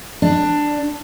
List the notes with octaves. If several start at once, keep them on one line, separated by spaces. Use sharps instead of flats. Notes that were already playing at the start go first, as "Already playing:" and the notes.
D4